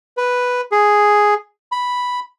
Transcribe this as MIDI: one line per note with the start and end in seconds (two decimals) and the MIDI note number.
0.17 0.61 71
0.72 1.34 68
1.72 2.20 83